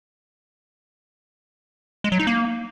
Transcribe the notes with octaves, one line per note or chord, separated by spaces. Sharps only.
G#3
F#3
D#4
A#3